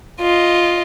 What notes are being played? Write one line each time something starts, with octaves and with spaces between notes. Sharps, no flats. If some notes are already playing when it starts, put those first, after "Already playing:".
F4 D#5